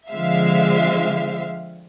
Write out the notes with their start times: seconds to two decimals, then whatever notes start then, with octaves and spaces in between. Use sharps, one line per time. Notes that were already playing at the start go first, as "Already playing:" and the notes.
0.10 D3 F3 G#3 C4 E5 F5